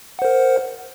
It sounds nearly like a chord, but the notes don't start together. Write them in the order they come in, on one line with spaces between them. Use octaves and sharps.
F#5 C5 A#4